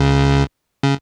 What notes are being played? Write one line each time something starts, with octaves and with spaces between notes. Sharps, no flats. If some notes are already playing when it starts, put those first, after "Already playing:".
Already playing: C#2 C#3
C#3